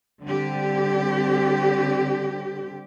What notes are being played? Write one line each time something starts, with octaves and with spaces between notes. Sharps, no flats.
D3 G3 C4 G4